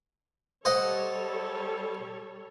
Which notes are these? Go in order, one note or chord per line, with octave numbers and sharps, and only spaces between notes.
G3 A4 C5 C#5 D#5 F#5